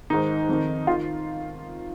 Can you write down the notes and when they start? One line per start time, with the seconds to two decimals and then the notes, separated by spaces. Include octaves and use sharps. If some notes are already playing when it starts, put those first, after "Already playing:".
0.10 G#2 D#3 D#4
0.49 F2 D#3
0.87 D#3 F4